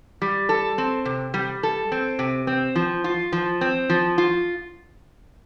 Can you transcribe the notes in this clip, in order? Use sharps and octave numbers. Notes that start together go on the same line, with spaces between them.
G3
A4
C4
C3
G3
A4
C4
C3
C4
F3
F4
F3
C4
F3
F4